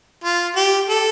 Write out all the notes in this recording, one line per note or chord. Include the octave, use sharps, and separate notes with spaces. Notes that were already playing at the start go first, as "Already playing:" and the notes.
F4
G4
A4